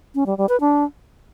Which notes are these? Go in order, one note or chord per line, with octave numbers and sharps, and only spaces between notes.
C#4
G3
G3
B4
D4